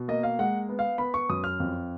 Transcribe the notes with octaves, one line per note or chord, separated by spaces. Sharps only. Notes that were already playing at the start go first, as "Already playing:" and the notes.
Already playing: B2
A#3 D#5
F5
G#3 F#5
B3
F5
B3 B5
C#6
F#2 D#6
F6
F2